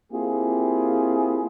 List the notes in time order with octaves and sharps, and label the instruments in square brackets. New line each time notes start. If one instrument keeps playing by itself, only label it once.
[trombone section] A#3 C4 E4 F4 G4 G#4